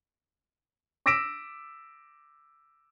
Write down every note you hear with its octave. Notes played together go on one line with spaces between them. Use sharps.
D6 E6 A#6 B6 D7 E7